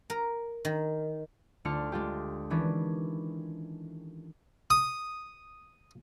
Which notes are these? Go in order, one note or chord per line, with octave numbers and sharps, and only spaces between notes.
A#4
D#3
D2 A3 D4 F4 F6 C#7
G#3 D4 F4 G4
D#3 E3 C#4 D4
D#6